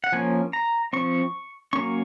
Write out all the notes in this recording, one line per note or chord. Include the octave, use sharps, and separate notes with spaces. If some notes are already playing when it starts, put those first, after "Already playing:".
F#5
F3 A#3 C#4 G#5
A#5
F3 C4 C#6
F#3 A#3 C#4 C#6